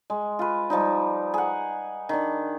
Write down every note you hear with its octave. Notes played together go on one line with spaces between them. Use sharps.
G#3
F4 B4
F3 G3 D#4
G#4 F#5
D#3 D4